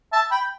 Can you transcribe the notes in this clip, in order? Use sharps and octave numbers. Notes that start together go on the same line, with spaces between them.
E5 A5
G5 B5